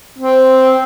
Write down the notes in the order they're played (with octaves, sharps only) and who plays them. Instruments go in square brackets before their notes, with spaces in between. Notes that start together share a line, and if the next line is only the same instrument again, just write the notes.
[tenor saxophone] C4